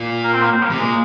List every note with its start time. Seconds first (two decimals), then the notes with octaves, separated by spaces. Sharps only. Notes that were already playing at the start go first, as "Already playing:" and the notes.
Already playing: A#2
0.23 A#3
0.33 C4
0.43 A#3
0.52 C4
0.62 A#3
0.71 C3
0.78 A#2 G#3